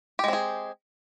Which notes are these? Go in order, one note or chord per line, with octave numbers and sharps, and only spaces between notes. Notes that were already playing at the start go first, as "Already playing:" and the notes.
G#3 C4 G4 G#4